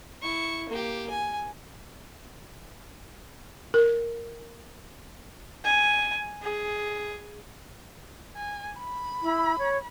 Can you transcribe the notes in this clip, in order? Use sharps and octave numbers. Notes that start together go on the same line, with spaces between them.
E4 C#6
A#3 G4
G#5
A#4
G#5
G#4
G#5
B5
E4
C#5